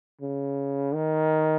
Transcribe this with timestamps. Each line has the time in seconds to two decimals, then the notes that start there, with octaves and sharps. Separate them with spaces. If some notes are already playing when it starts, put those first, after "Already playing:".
0.21 C#3
0.94 D#3